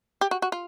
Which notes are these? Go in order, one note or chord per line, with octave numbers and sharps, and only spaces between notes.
G4
F#4
F#4
F4